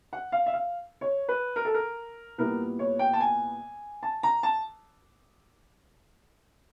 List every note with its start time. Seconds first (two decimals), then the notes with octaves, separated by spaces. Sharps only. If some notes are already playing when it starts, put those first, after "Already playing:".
0.13 F#5
0.32 F5
0.46 E5
0.53 F5
1.01 C#5
1.29 B4
1.56 A#4
1.65 A4
1.74 A#4
2.38 A#2 G3 B3 E4 A#4
2.79 C#5
2.99 G5
3.13 A5
3.20 G#5
4.03 A5
4.23 A#5
4.43 A5